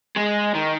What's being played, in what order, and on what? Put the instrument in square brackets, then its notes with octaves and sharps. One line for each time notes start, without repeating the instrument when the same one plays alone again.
[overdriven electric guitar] G#3
D#3